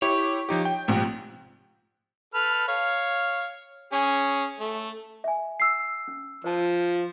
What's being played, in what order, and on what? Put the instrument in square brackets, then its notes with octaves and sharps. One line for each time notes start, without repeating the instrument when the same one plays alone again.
[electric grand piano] E4 G4 [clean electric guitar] C#5
[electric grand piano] F3 D#4 G4
G5
[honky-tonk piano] A#1 G#2 C3
[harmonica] A4 B4 F6
C#5 F5
C#4 G#4
A3
[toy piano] E5 G#5
[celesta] E6 C7
[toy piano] C#4
[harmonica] F3 [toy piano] C5 A5